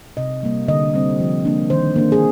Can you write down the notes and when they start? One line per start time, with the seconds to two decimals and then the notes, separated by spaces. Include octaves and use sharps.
0.17 C3 D#5
0.43 G3 A#3
0.68 D3 D#5
0.94 G3 C4
1.20 F3
1.45 A#3 D4
1.70 D#3 C5
1.96 A#3 D4
2.12 G#4